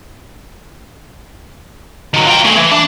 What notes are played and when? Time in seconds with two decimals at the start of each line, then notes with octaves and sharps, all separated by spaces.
2.14 D#3 F#3
2.27 F4 G5
2.45 A3 G#4
2.57 E3
2.72 D4